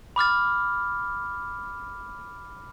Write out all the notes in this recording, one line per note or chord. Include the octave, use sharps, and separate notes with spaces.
B5 D6 F6 A6